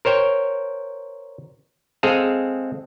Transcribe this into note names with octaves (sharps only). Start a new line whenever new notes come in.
A#4 C5 C#5 G5
G#3 C4 G#4 A4 F5